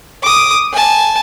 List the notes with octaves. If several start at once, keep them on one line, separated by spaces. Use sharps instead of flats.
D6 D#6
G#5 A5